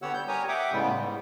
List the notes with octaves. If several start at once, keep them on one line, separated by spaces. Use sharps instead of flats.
D3 B3 G4 C#5 F#5 E6
G3 G6
G4 A#4 C#5 G#5 A#5 D#6
E5 F#5 G5 D6 D#6
A2 C#3 G3 G#3 B3
G#2 G3